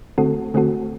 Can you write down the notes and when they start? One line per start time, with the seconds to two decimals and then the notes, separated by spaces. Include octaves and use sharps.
0.18 D3 A3 C4 F#4 A4
0.54 D3 A3 C4 F#4 A4